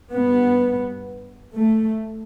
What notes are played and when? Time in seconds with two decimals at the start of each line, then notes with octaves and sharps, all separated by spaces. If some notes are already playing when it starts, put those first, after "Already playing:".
0.12 G2 B3
1.56 A3